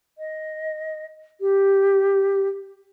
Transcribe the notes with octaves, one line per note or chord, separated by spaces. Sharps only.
D#5
G4